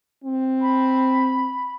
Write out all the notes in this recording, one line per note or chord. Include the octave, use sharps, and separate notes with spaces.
C4
B5